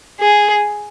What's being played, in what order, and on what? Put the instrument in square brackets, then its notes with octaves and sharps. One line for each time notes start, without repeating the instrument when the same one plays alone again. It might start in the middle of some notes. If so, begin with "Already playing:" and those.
[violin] G#4